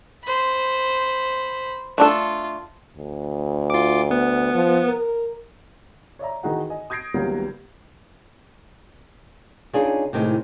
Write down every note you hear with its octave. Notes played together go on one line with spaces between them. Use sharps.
C5 B5
A3 D4 F4 A4
D2
F4 D6
B3
F3
A#4
C#5 D5 E5 A#5
D#3 E3 D#4 F#4 G#4 F#5
D#5 G#5
D#6 G6 G#6 A#6 C7 D7
C#2 D#3 F#3 G3 A#3 B3
C#3 D4 D#4 F4 G#4
A2 C3 D#3 G#3